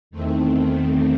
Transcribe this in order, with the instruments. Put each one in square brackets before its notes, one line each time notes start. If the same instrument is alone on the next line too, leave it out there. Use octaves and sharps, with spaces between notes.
[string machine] E2 D#3 A3 C4